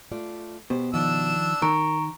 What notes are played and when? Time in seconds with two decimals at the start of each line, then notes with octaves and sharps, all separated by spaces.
0.11 A3 F4 D5
0.70 B2 G4 C5
0.93 D#3 F3 D4 E6
1.62 D#3 A#4 A#5 C#6 D7